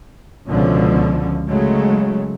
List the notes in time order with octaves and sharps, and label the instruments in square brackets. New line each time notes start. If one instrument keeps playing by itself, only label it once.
[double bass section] C#2 B2 D3 F3 C#4
C#3 F#3 G#3 A3